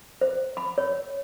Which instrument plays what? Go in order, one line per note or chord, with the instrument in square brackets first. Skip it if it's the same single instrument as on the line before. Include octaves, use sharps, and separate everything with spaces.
[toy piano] C5
B5
C#5